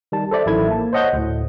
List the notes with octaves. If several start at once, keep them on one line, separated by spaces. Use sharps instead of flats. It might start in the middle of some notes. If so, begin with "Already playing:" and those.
D#3 G3 A5
A4 C5 D5 E5
A1 D#3 F#3 E4 A4 G#6
A#3 A5
C5 C#5 D#5 F#5 D#6 G6
D2 A2